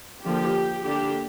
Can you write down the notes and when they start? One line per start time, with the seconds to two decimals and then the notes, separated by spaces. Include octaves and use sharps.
0.24 D3 F3 A#3 G4
0.85 D3 A#3 D4 G4